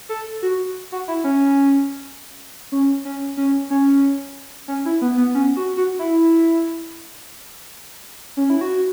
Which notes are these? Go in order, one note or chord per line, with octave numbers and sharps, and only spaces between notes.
A4
F#4
F#4
E4
C#4
C#4
C#4
C#4
C#4
C#4
E4
B3
B3
C#4
F#4
F#4
E4
C#4
E4
F#4